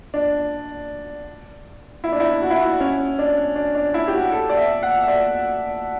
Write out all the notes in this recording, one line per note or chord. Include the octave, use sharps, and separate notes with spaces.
D4
E4
D4
E4
F#4
E4
F#4
C#4
D4
D4
D4
E4
G4
F#4
A4
D5
E5
F#5
E5
D5